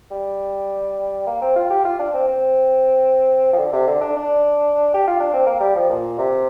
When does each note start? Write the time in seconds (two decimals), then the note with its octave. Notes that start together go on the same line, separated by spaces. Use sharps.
0.11 G3
1.27 A#3
1.41 C4
1.56 F4
1.70 G4
1.85 F4
1.99 D4
2.14 C4
2.28 C4
3.53 F3
3.58 D3
3.72 C3
3.87 D3
4.01 D4
4.16 D4
4.94 G4
5.07 F4
5.20 D4
5.33 C4
5.46 A#3
5.60 G3
5.75 F3
5.89 A#2
6.18 C3